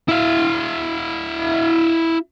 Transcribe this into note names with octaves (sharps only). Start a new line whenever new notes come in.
E4 F5